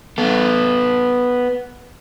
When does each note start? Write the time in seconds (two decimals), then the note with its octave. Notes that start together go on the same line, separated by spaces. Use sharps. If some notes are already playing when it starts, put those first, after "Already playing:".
0.18 B3 A4